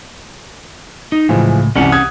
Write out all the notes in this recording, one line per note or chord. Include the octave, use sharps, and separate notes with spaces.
D#4
C#2 A2 E3 F3 G#3
C2 F#2 E3 C#4 G4 F#5
D#6 F#6 G#6